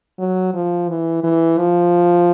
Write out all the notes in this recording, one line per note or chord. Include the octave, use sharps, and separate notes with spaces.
F#3
F3
E3
E3
F3